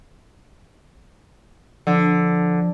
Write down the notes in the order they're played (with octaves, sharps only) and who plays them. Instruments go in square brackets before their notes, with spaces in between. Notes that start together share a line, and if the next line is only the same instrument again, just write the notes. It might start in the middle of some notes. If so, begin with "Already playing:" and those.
[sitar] D3 [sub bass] F3